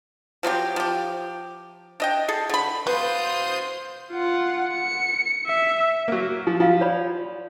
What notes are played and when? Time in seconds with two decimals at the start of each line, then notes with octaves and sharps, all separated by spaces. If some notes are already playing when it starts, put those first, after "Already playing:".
0.43 F3 F#3 C4 G4
0.76 F3 G4
2.00 D4 D#5 G5
2.28 G#4 A4
2.49 D3 B5
2.87 B3 F#4 C5 F5 C6 D#6 G6
4.11 F4 F#5
4.73 C#7
5.46 E5
6.08 F#3 A#3
6.47 F3
6.60 F3 F4 F5
6.81 C#5 D5 B5